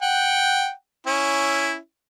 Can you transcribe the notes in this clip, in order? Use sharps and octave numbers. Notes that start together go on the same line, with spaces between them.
F#5 G5
C#4 E4